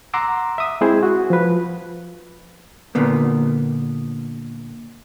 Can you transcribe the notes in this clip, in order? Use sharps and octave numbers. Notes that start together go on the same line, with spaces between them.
F#5 A#5 C6 D6 E6
E5 D#6
G#3 C4 E4 G#4 C5
F#4
F3 B4
A#2 D3 A#3 B3